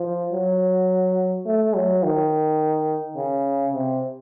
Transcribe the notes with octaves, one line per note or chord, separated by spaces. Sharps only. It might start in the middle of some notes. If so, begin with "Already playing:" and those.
Already playing: F3
F#3
A3
F#3
D#3
C#3
C3